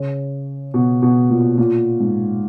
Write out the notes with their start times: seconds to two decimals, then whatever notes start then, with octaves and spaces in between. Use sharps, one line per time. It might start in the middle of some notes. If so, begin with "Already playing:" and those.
Already playing: C#3
0.74 B2
1.02 B2
1.30 A#2
1.58 A#2
2.00 G#2